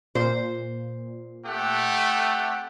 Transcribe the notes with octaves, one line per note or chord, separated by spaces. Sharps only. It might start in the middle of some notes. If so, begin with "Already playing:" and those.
A#2 C5
A3 C4 G4 F#5